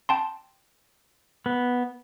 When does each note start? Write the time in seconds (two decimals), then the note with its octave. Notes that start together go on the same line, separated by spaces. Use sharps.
0.09 G5 A5 C6
1.46 B3